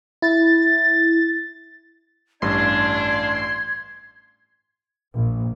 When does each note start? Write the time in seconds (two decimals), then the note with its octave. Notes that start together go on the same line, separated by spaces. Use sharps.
0.22 E4 A6
2.42 A1 G2 D4 C6 G#6
5.14 A#1